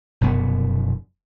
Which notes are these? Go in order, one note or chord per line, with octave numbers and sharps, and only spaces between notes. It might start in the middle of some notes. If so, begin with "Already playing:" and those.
F1 F#2 B2 B3